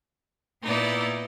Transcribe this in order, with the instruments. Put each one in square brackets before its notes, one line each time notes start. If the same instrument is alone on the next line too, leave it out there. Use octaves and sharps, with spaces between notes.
[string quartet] A#2 B3 D5 [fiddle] D#4 E4